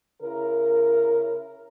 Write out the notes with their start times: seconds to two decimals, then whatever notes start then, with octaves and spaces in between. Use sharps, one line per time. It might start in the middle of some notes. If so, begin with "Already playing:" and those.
0.22 C#3 E4 A#4